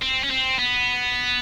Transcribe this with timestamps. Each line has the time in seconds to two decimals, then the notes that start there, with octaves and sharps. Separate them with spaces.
0.02 C4
0.24 C#4
0.31 C4
0.59 B3